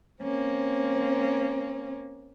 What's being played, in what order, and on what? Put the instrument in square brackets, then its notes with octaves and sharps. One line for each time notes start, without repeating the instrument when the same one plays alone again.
[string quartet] A#3 C4 C#4